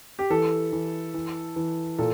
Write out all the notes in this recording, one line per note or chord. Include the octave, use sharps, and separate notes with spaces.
G4
E3 A4
E3
E3
E3
A#2 A4